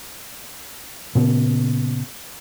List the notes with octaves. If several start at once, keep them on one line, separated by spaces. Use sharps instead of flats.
A#2 C#3 B3